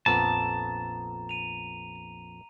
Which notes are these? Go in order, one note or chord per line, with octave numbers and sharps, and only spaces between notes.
A#1 F2 B3 A5 A#5
D#7 F7